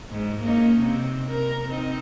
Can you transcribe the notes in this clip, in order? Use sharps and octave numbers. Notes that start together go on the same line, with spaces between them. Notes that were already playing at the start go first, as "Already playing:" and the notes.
G#2
A#3 C#4 D#4
C3 C4
A#4
C4 D#4